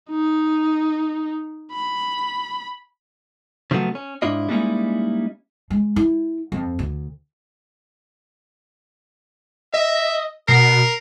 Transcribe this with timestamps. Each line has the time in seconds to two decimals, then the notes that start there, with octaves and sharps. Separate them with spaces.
0.10 D#4
1.73 B5
3.71 C#3 F3 F#3 A3 B3
3.95 C#4
4.22 G#2 D4 E4 F4 D#5
4.49 G3 G#3 A#3 C#4 D#4 E4
5.70 G#3
5.96 E4
6.52 F2
6.79 D2
9.74 D#5 E5
10.48 B2 A#4 C7